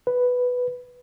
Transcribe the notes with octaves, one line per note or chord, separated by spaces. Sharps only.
B4